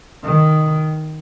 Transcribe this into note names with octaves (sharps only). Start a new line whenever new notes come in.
D#3